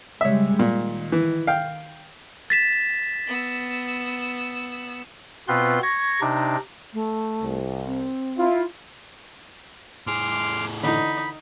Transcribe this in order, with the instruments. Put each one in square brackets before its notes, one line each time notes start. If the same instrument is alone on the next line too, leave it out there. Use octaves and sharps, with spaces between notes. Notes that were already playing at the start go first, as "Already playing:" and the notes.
[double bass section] C#3 G3 G#3 [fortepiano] C#5 E5
[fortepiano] A#2 [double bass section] D#3
[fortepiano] E3
F5 G5
[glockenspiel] A6 B6 E7
[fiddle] B3 E6
[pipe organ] B2 B3 C4 F4 B4 C6
C#6 G#6 A#6
C3 D4 D#4
[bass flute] A3
[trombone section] C2
[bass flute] C4
[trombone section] E4 F4
[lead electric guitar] A2 G#4 [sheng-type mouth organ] C6 D6 F6
[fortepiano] D3 E3 [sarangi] D#4 [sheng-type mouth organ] B5